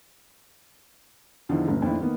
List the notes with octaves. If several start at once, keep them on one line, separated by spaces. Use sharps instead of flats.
E2 D3 D#3 F3
G1 D2 A#2 C#4
F2 A#2 D#3 A3 D4 E4
D#3 A#3 B3